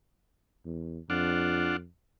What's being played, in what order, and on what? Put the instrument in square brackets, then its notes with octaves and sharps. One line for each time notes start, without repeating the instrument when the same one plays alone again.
[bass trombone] E2
[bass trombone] F2 [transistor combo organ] D4 F4 F#5